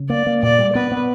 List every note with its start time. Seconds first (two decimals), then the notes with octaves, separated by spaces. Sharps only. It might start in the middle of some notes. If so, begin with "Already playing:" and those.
Already playing: C#3
0.10 A#3 D5
0.27 A#3
0.42 A#2 D5
0.59 G3
0.75 B3 B4
0.92 B3